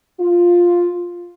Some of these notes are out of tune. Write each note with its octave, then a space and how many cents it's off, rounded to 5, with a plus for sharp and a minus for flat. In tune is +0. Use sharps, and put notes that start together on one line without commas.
F4 +5